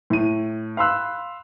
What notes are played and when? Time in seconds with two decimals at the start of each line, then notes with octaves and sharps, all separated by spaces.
0.10 A2 D#7
0.77 F5 B5 C6 E6 F#6